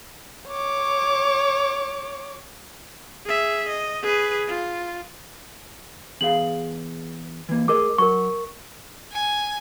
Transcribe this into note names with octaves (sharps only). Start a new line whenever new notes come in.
C#5 D6
G#4 E5
D#5
G#4 B4
F4
E2 G#4 F5 F#7
E3 A#3
A3 G#4 A#4 D#5 D6
F#3 A#4 C#6
G#5